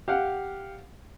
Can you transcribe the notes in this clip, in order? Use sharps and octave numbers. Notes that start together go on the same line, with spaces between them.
G4 F5 F#5